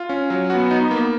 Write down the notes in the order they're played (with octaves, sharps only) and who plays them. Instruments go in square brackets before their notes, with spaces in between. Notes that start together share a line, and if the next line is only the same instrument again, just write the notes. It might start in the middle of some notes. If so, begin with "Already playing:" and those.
Already playing: [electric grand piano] F4
C#4
F#3
[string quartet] B3 [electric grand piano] F#4
[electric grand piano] D#4
A#3